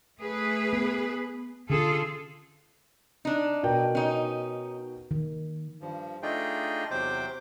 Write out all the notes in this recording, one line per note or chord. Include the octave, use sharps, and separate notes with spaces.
A3 G#4 B4
B3
D3 C#4 F4 G#4 A4
D4 D#4
B2 A#4 G5
C#4 D#4
D#3
G2 F3
A3 D4 D#4 F4 G#4 G5
E2 C3 F#3 C5 G5 D6